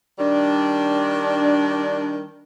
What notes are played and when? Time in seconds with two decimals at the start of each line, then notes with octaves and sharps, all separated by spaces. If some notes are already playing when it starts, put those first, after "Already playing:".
0.19 D#3 G3 D4